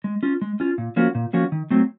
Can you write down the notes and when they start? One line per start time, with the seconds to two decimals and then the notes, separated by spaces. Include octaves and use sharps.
0.04 G#3
0.23 C#4 F4
0.42 G#3
0.60 C#4 F4
0.78 A#2
0.96 F3 A#3 C#4 F#4
1.15 A#2
1.33 F3 A#3 C#4 F#4
1.52 D#3
1.70 F#3 A3 C4